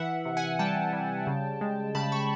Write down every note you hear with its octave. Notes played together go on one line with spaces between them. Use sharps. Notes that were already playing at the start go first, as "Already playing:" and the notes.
Already playing: E3 E5 F#5
C3
F#5 G#5
G3 G5 A5
G3
C#3
G#3
C#3 A5 B5
B5 C#6